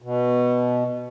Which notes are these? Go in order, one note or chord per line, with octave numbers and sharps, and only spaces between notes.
B2